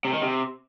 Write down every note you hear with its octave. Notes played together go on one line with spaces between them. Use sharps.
C3
D#3
C3